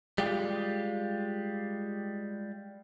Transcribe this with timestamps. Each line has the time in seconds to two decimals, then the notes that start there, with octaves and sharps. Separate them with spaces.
0.18 G3 G#3 F4 G4